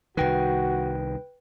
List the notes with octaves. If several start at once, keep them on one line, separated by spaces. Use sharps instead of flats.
C2 D#3 F#4 B4 G5